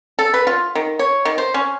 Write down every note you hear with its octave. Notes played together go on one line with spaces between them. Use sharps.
A4
B4
F4
D#3
C#5
D#3
C5
C#4